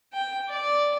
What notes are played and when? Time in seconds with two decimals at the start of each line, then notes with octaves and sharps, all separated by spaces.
0.13 G5
0.49 D5